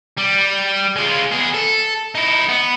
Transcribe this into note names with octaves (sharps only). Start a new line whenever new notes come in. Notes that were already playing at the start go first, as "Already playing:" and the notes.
G3
G#3 F4
B3 G#4
A4
D#4 E4
B3